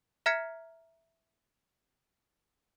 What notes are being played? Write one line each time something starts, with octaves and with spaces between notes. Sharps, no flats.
E5 A#5 F6 G#6 B6 C#7